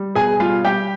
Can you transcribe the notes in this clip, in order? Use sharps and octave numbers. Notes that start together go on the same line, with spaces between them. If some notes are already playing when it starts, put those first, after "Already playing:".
Already playing: G3
B2 G#4 G#5
G3 F4 F5
G3 G4 G5